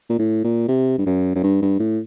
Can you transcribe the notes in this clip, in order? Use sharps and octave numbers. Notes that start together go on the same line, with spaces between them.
A#2
A2
A#2
C3
G2
F#2
F#2
G2
G2
A2